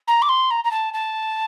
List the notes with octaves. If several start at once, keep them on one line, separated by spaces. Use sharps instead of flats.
A#5
D6
C6
A#5
A#5
A5
A5